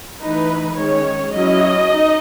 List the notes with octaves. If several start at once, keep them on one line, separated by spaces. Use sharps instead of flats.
E3 A3 D#4 B4
D#3 G#3 C#4 C#5
F#3 C#4 E4 D#5
D#4